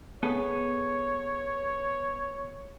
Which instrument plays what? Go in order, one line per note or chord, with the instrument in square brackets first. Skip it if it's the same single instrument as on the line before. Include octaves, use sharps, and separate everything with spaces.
[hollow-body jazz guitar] B3 G#4 A4 [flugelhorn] C#5